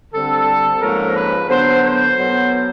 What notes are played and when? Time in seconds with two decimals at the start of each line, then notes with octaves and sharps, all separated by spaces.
0.13 D3 G3 C4 A4
0.81 G#2 F3 A#3 C#4 A#4
1.14 B4
1.48 D3 F#3 B3 C5
1.83 C5
2.17 B2 F#3 B3